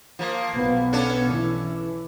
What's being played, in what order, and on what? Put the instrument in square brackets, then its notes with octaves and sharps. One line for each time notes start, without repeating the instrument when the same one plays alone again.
[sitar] F3 A#3
[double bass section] B1 B3
[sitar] C#4 D4 A4
[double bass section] E3